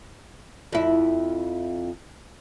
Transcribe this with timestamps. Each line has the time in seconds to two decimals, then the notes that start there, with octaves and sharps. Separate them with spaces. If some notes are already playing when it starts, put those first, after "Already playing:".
0.72 F2 E4